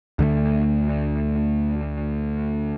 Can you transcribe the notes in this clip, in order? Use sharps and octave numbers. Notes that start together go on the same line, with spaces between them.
D2 D3 G3 A3